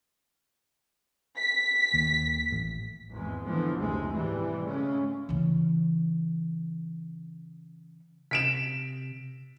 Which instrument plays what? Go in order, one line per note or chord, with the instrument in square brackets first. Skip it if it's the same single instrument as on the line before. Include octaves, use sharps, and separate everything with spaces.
[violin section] B6
[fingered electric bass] D#2
A1
[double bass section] G#1 E2 G#3
D3 E3 F3 B3
F#1 D2 C3 G#3 A3
G#1 G#2 B2 E3 G3
C#3 G#3 A3 C#4
[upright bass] C#3 E3
[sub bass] C3 [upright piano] B6 D7 E7